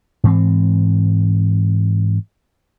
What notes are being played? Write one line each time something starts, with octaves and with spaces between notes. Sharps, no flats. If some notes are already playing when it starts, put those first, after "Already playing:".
G#2 E3 C4